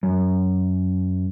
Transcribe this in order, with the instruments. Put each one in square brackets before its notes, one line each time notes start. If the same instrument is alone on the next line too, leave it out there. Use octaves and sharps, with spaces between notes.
[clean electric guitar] F#2